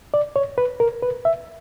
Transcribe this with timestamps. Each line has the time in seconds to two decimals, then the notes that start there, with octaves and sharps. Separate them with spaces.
0.14 D5
0.36 C#5
0.58 B4
0.80 A#4
1.02 B4
1.25 E5